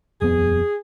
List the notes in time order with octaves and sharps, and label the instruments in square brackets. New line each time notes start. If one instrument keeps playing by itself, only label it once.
[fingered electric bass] D#1 F2 B3 [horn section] G#4